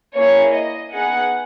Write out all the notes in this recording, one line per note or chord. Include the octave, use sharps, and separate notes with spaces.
A#3 E4 G#4 C#5
D#5
B3 D#4 G#4 F#5